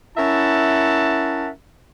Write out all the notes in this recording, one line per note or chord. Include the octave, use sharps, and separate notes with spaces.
C#4 E4 A#4 E5 F#5 A5